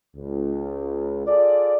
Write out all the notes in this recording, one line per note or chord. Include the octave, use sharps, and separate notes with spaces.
C#2
F4 G#4 A4 D5